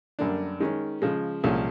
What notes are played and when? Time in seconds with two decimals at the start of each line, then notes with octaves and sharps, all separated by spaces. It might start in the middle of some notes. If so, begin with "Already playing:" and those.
0.19 F#2 D3 G3 A#3 D4
0.60 D#3 G#3 C#4
1.02 C#3 F3 G#3
1.43 C2 A#2 F3 G#3 C#4